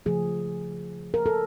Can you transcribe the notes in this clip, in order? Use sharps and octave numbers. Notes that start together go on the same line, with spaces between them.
C#3 F3 A3 G#4
A#4
A4